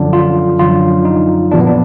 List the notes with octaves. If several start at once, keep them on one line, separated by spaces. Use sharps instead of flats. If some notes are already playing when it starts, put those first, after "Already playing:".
Already playing: F#2 D3 F3 D4
F4
F#2 D3 F3 F4
D#4
A#2 F3 A#3 D4
B3
D4